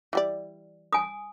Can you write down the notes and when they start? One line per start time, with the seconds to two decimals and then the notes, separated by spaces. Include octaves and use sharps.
0.13 E3 G3 D5
0.93 G#5 D#6